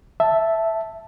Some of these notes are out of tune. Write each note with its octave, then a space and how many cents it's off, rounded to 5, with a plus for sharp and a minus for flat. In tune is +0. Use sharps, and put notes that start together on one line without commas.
E5 +0 A5 +0